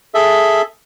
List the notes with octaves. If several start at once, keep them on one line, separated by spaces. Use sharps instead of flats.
G#4 A4 E5